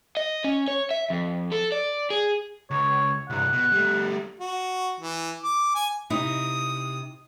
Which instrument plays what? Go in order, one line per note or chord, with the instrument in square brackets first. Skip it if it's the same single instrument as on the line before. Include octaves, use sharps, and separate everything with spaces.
[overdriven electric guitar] D#5
C#4
C#5
E5
F2
A4
D5
G#4
[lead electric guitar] C#2 [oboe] C#5
[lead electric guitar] C2 G2 [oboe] F#5
[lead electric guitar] B2
G3 A3
[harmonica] F#4
E3
D6
G#5
[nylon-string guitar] C3 D#4 E4 [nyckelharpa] D#6